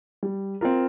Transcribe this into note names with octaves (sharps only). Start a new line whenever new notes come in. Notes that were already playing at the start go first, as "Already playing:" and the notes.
G3
C4 F4 A#4